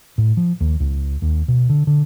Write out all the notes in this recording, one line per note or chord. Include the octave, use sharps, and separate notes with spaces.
A2
F3
D#2
C#2
D#2
B2
D3
D3